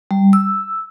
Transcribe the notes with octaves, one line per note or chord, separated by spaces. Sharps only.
G3
E6